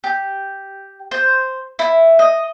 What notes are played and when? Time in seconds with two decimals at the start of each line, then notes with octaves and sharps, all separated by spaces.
0.04 G4
1.11 C5
1.79 E4
2.19 D#5